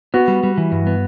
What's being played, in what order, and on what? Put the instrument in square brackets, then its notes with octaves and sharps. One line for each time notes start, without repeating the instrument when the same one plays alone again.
[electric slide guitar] B3 [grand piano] F#4
[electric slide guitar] G3
G3
E3
G2
B3